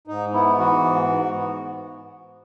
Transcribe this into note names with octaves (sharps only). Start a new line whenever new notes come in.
G#2 D#4
B3 E4
E3 F#4
G#2
G#2
B3